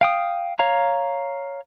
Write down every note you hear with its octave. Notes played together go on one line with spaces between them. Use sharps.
F5 G5 D#6
C#5 F5 A#5